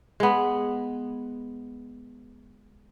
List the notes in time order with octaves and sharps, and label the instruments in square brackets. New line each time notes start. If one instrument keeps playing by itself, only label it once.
[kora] G#3 B3